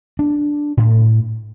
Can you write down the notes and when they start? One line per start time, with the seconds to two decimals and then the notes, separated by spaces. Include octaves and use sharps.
0.19 D4
0.77 A2